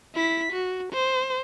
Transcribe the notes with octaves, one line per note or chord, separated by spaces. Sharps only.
E4 B6
F#4
C5